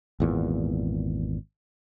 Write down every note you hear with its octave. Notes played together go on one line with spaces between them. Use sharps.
G#1 E2 A#2